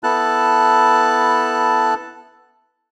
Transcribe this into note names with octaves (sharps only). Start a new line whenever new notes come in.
B3 E4 A4 A5 F#6